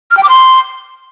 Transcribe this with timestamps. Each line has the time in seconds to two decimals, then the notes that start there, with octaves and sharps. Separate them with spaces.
0.11 F6
0.17 G5
0.23 D6
0.29 C6